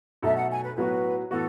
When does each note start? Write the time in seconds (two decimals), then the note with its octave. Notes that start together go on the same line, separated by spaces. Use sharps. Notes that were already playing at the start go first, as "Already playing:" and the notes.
0.22 B2 F#3 A3 D#4 A4 E5
0.36 F#5
0.50 G#5
0.64 B4
0.76 A2 F#3 B3 F#4 B4
1.31 A2 E3 B3 F#4 A4